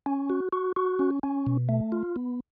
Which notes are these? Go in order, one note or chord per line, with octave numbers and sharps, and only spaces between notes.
C#4
F#4
F#4
F#4
C#4
C#4
B2
A3
F4
B3